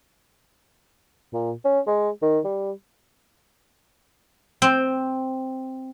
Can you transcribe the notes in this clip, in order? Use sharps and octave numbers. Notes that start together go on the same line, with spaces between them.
A#2
C#4
G#3
D#3
G3
C4